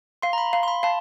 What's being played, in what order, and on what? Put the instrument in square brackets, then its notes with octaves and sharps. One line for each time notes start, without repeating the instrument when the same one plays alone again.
[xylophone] F5 [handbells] C6
[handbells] A#5
B5
[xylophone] F5 [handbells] C6
[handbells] C6
B5
[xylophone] F5 [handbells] A5